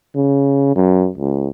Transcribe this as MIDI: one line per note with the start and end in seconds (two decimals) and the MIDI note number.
0.16 0.74 49
0.76 1.09 42
1.18 1.48 37